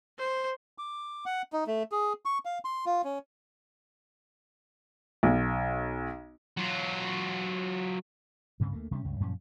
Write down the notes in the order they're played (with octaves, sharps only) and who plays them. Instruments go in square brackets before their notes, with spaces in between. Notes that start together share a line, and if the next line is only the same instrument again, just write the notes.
[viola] C5
[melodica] D6
F#5
D#4
A3
G#4
C#6
F5
C6
F4
C#4
[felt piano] B1
[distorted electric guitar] F#3 F4
[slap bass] D2 G2 C#3 C4
D2 A3 A#3
C3 G3 A3 C#4
C#2 G2 C#3
F#2 A#2 F3 C#4